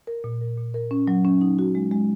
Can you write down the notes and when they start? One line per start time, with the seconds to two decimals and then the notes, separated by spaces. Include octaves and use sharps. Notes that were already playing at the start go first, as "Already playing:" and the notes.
0.07 A#4
0.24 A#2
0.41 A#4
0.57 A#2
0.74 A#4
0.91 C#4
1.07 F#3
1.25 C#4
1.41 D#4
1.59 F#4
1.75 G#3
1.91 G#3